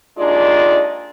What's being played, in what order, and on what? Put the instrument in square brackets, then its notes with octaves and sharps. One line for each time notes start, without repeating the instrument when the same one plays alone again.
[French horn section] D#2 G#3 D4 D#4 F4 D5